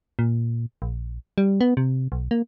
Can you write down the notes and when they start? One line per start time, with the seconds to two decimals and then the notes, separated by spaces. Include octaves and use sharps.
0.19 A#2
0.82 A#1
1.38 G3
1.61 B3
1.77 C3
2.12 B1
2.31 A#3